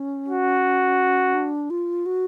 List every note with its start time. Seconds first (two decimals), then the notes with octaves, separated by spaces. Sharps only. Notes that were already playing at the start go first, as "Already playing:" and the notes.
Already playing: C#4
0.28 F#4
1.34 D4
1.70 F4
2.06 F#4